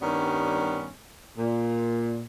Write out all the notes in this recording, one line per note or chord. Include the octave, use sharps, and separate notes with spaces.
G2 D#3 G3 B3 C#4
A#2